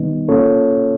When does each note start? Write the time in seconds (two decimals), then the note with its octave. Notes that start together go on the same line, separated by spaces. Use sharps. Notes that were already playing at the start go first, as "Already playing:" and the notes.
Already playing: D#3 G3 B3 D#4
0.28 A#3 C#4 F4 A4 C#5